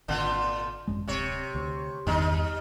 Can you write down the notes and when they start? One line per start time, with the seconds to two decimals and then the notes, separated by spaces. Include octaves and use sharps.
0.08 G#1 A#2 D3 F4
0.87 G#1 F#2 G#3
1.08 D1 C3 C#5
1.55 D2
2.07 G1 E2 D3 D#3 G3 D#4